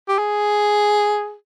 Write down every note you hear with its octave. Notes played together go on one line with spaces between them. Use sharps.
G4
G#4